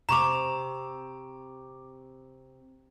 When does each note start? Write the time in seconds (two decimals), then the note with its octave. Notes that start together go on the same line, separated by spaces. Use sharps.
0.09 C3 A#5 C#6 D6 E7 F7